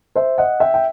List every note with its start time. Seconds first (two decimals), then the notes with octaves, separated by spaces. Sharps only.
0.15 C5 E5
0.38 D#5 F#5
0.60 E5 G5
0.74 G5